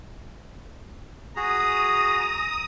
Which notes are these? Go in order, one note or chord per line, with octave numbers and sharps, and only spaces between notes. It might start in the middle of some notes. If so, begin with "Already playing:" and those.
F#4 G#4 A#5 D#6